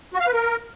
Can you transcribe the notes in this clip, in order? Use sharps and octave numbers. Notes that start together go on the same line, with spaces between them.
F#4
F5
B4
A#4